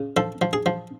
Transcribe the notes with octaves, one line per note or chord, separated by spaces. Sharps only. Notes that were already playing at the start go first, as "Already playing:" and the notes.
Already playing: C#3
F3 A4
F3
G#4
F3